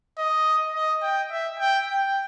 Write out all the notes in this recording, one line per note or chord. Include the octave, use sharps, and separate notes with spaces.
D#5
D#5
G5
E5
G5
G5